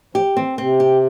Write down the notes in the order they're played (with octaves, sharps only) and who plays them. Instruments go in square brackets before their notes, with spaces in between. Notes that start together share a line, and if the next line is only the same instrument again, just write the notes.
[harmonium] F3 [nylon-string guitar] G4
[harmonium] E3 [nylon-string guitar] C4
[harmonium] C3 [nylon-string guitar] C4
[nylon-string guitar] G4